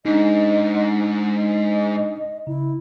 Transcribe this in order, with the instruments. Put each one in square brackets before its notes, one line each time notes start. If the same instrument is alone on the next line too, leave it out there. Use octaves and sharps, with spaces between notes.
[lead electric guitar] G#2 [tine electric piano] D4 D#4 [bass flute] D#5
[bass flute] D#5
[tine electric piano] C#3 [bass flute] E4